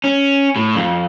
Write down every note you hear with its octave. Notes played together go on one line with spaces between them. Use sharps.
C#4
A2
F2